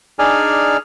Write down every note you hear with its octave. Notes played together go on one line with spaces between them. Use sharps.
D4 D#4 G#4 D5 G#5 F6